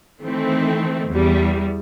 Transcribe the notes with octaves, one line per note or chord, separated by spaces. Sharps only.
D#3 E3 A3 C4
E2 G3